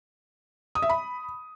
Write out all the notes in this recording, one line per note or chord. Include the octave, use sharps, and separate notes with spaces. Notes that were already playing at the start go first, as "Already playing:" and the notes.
D#6
E5
B5